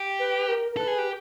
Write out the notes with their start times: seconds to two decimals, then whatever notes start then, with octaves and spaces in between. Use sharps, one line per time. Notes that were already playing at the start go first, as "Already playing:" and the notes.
Already playing: G4
0.19 B4
0.48 A#4
0.71 A#4
0.77 A4 B4
0.87 G#4
0.98 G4